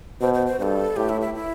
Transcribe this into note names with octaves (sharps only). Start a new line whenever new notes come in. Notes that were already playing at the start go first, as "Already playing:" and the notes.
B2 C5
C5
C5
G2 A4 C5
A2 G4
E4
E4
E4